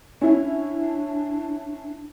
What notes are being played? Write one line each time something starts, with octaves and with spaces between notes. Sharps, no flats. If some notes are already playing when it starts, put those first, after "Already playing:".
C#4 D4 E4